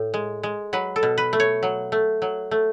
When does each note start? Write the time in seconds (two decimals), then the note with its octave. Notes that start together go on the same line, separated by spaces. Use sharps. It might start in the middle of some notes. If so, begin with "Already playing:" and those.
Already playing: A2
0.14 G#3
0.43 G#3
0.73 F#3 B4
0.96 A4
1.03 B2
1.18 B4
1.33 A3
1.40 C#5
1.63 F#3
1.92 A3
2.22 F#3
2.51 A3